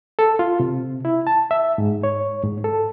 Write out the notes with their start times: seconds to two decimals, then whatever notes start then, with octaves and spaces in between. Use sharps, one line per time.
0.19 A4
0.39 F4
0.60 C3
1.05 E4
1.27 A5
1.51 E5
1.78 G#2
2.03 C#5
2.44 G#2
2.64 A4